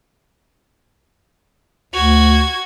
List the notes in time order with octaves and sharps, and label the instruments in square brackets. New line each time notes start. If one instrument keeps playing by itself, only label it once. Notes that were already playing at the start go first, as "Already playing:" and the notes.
[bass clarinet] D2 [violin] F#4 G#6